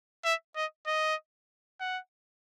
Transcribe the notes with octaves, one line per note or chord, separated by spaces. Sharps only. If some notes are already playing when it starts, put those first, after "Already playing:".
E5
D#5
D#5
F#5